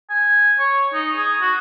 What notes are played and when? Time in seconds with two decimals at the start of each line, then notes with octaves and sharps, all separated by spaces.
0.10 G#5
0.59 C#5
0.93 D#4
1.16 G#4
1.41 F#4